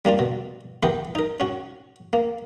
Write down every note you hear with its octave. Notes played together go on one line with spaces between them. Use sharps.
G3 A#3 D4 F4
B2
E3 B3 G4 A#4 B4
D#4 A#4
C#4 F#4
A#3